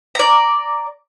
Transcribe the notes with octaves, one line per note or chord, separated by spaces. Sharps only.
D5 A#5